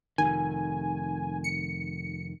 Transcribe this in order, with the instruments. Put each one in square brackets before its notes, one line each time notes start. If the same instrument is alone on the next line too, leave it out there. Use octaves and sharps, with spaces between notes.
[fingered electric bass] F1 A#1 D#3 [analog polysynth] G#5
[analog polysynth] C#7